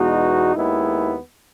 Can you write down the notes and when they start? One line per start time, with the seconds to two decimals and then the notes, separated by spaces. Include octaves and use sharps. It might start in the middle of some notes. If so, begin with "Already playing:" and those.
Already playing: E2 B2 G#3 D#4 F#4
0.55 D#2 D#3 G#3 B3 E4